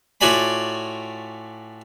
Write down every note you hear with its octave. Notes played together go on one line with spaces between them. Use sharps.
A2 F4 F#4 D5 G#5 B5